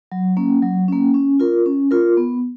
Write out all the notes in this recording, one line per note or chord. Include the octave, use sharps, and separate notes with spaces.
F#3
A#3 C#4
F#3
A#3 C#4
C#4
F4 A#4
C#4
F4 A#4
B3